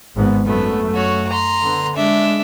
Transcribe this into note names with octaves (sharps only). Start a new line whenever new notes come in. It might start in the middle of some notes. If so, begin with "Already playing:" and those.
G#1 G#2 B3
F#2 A3 B3
F#4 C#5
A#5 C6
D3 B3
G#3 D4 E5